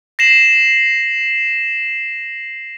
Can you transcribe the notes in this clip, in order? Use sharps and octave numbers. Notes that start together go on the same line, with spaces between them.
A#6 C7 E7 F#7